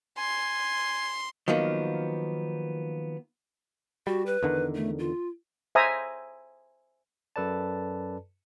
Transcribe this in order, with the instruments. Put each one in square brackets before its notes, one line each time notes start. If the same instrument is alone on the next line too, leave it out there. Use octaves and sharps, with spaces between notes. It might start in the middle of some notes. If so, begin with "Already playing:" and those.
[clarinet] G#5 [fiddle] C6
[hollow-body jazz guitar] D#3 F3 F#3 A#3 B3
[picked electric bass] G3 [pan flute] F#4
[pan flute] B4
[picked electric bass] E2 D3 D#3
[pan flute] A3
F4
[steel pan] C5 E5 G#5 A#5 D#6
[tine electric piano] F#2 A4 B4 D5 A5